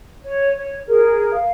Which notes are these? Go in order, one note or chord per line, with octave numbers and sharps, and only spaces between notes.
C#5
C#5
G#4 A#4
F5